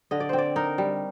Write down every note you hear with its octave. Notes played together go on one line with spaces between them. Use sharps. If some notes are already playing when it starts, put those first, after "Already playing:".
D3 D#5
D5
C4 C5
D5
D#4 A#4
G3